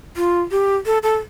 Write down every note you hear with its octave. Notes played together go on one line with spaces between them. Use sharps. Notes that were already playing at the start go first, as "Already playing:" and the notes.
F4
G4
A4
A4